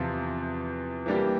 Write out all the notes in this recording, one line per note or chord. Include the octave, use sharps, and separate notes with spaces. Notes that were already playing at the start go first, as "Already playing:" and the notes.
Already playing: E2 C3 F3
E3 G3 A#3 D4 G4